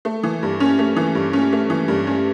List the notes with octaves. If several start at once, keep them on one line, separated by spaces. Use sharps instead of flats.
A3
E3
G2
C#4
A3
E3
G2
C#4
A3
E3
G2
C#4